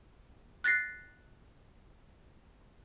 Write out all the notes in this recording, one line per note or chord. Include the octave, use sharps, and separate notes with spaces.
F#6 A6 A#6 C7